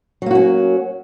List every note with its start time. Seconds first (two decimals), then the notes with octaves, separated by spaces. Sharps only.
0.22 F#3
0.26 A#3
0.31 F#4
0.35 C#4